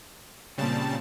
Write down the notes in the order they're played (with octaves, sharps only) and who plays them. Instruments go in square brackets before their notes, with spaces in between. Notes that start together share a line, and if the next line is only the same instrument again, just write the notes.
[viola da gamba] A#2 A#3 C4 [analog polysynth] C#3 G3 A5